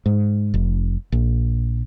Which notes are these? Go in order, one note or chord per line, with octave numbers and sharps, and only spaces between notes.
G#2
F1
A#1